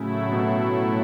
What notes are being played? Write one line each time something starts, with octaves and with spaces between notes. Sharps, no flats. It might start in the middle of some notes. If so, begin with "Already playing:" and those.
Already playing: A2 C#3 F#3 A3 E4
B2